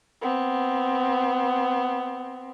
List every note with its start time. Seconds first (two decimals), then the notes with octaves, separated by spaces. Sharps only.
0.22 B3 C4